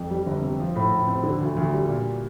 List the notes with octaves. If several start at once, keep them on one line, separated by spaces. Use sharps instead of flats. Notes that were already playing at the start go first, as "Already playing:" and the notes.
Already playing: F2
G3
G1
C3
F3
A2
A2
C4
D3
D2
D2
G3
A#2